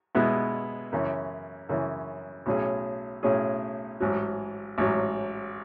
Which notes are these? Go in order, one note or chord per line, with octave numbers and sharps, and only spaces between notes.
B2 G#3 B3 E4
F#2 C#3 E3
F#2 C#3 E3
B1 A2 F#3 C#4 G#4
B1 A2 F#3 C#4 G#4
A1 G#2 F#3
A1 G#2 F#3